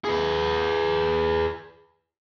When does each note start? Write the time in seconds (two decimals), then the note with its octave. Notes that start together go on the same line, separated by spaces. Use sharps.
0.05 G#4 B4